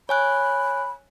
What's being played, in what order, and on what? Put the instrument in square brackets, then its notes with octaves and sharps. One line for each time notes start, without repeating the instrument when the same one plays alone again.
[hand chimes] C#5 G#5 F#6 [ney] B5